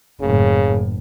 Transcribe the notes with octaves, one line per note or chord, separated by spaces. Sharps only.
F#1 A2 C#3